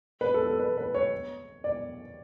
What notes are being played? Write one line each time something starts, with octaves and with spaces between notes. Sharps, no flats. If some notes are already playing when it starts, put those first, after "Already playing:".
B4
A4
A4
B4
B4
C#5
D5